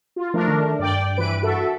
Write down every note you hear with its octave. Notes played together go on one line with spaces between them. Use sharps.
F4
F3 A3 D4 A#4
D#3
G2 D5 G5
E3 B4 D7
F#4 A4 E5